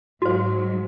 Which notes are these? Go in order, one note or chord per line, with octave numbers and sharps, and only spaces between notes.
G#2 F#3 F#4 C5